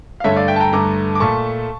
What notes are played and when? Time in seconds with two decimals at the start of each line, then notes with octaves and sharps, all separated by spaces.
0.20 F5
0.24 G2 D3 A3 C#5 E5
0.36 D5 F5
0.48 E5 G5
0.56 A5
0.60 G5 A#5
0.73 G2 D3 A3 A#5 D6
1.15 D6
1.20 A#2 A3 A5 C#6